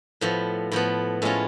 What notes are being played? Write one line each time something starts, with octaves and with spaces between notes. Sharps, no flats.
A2 F3 B3
A2 F3 B3
A2 G#3 C#4 F4